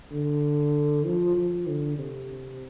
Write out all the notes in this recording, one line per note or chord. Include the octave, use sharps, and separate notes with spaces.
D3
F3
F3
D3
C3